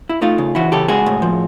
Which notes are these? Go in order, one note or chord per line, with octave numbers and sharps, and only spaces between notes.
E4
A3 D#4 F4
C#3
E3 E4 F#4
C#3 G4 A4
G#3 F#4 G#4
A2
F3